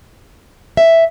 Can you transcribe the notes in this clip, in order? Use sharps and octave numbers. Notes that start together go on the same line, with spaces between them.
E5